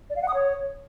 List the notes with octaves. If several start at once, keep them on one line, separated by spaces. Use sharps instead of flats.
D5
F5
F#5
D#6
C#5